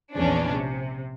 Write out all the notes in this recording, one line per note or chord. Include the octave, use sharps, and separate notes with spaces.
A#1 E2 C#4 D4
C3